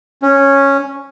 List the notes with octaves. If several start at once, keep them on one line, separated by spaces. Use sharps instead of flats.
C#4